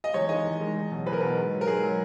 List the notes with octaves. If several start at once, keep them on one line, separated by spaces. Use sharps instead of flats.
D#5
E2 C#5
D#3 G#3 D#5
E2
D#3 G#3
E2
B2 F#3
E2 B4
A#4
B2 F#3 B4
G#2
F#3
A#4
G#2 G#4
F#3